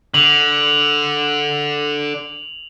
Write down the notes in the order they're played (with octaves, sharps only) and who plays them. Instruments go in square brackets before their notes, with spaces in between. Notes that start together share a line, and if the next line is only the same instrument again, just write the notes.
[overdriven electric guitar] D3 [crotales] F7 F#7